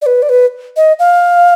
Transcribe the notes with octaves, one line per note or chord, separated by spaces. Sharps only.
D5
B4
D5
B4
D#5
F5